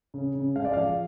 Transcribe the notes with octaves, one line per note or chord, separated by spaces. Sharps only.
C#3
C#3
G#3 F5
D5
F3 F5